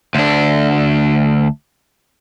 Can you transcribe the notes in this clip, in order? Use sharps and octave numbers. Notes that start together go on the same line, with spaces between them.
D2 D4